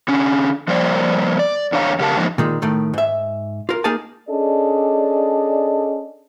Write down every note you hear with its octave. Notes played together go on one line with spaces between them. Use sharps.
D3 C#4
F3 G3 A#3 C5 D5
D5
E2 D4 C#5 F5 A#5
E2 C#3 G4 A#4 F5 A5
G#2 D3 F3 A#3 D#4
A#2 D#3 G#3
A2 D#3 A3
G#2 E5
F4 A#4
A#3 D#4 G#4 A#4 G#5 A5
C#4 D4 G#4 A4 D5 D#5